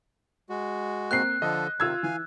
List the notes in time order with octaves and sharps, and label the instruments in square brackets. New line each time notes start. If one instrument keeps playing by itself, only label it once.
[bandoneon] G#3 F#4
[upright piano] A#3 C4 C7 [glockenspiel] F#6
[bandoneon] D3 F3 A4 [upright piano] D#5
[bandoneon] C3 D#3 [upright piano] F4 E6 G#6
[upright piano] E3 [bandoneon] F5 G#5